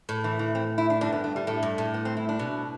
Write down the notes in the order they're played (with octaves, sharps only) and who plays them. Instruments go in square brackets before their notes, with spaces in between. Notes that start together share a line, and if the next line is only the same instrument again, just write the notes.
[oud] A2
[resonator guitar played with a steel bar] E3
E3
C4
E4
D4
[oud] G2 [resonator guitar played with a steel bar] D4
[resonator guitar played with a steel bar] B3
A3
G3
[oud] A2 [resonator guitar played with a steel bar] A3
[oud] G2
A2
[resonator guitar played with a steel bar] B3
C4
E4
D4
[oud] B2